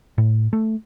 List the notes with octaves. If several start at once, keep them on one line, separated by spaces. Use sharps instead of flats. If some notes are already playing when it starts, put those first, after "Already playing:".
A2
A3